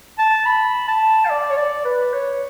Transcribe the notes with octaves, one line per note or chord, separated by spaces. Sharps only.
A5
B5
A5
F5
D5
C#5
D5
B4
C#5